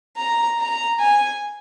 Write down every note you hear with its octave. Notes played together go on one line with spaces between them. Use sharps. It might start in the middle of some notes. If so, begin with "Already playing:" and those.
A#5
A#5
G#5